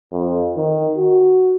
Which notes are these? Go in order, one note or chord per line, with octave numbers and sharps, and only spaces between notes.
F2
D#3
F#4